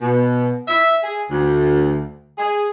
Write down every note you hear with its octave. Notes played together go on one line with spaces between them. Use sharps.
B2
E5
G#4
D2
G#4